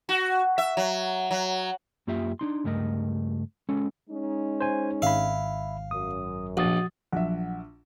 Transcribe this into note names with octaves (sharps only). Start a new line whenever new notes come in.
F#4
E5
F#3
F#3
F#2 A#3 F4 G4 E5
D4 D#4 C6
C#2 G2 A3 A#4 D#5
G#3 C#4 A4
G#3 C#4 D#4
C5 G#5
G#1 E5 F5 B5
F#2 D#6
A#1 F#4 D#6 A6
A#1 F3 F#3 E5 F#5